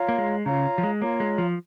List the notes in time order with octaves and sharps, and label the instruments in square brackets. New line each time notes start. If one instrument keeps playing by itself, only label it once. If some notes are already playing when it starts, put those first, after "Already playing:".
Already playing: [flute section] F4 C#5 F5 A#5
[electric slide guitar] A#3
G#3
[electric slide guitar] C#3 [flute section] F4 C#5 F5 A#5
[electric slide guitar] F3
G#3
[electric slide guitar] A#3 [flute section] F4 C#5 F5 A#5
[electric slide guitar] G#3
F3